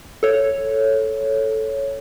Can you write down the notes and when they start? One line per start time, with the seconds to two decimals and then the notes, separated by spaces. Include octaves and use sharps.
0.23 A4 C#5